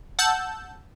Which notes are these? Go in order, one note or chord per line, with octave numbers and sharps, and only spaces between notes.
F#5 A5 E6 G6